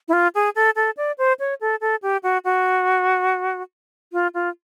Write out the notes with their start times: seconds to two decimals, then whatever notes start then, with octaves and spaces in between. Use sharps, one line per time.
0.08 E4
0.13 F4
0.35 G#4
0.56 A4
0.76 A4
0.97 D5
1.18 C5
1.40 C#5
1.61 A4
1.81 A4
2.02 G4
2.23 F#4
2.44 F#4
4.13 F4
4.34 F4